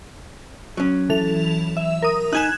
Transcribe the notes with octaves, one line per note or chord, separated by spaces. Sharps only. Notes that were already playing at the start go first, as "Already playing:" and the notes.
F#3 C#4
E3 A4 F7
E5
A#4 D#6
D#4 G#5 F#6 G#6 E7